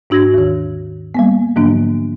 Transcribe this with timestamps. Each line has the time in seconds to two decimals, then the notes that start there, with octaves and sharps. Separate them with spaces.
0.10 G#2 D4 F#4 G#6 A#6
0.34 D#2 D#3
1.15 G3 A#3 B3
1.56 G#2 D3 F3 F#3 A#3 D4